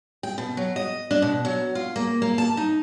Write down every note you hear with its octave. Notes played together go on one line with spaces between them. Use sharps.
G5
B2
F#3
D#5
D4
B2
F#3
F4
A#3
A#3
A5
D#4